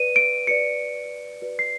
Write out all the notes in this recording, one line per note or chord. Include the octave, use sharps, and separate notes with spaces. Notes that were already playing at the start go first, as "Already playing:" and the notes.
Already playing: B4 D5 D#7
D7
F#4 B4 D5 C#7
F#4 B4 D5
C7